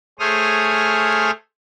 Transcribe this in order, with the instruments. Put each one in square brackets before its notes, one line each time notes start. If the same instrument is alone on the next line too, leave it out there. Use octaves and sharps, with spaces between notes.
[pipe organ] A3 G#4 C5 C#5 D#6 F6